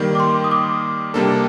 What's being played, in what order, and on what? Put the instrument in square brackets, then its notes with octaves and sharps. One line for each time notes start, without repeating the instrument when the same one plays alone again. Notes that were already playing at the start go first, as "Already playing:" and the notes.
Already playing: [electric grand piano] D#3 G3 A#3
[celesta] D6
C6
D#6
D6
[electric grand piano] C3 G3 A#3 D4 A4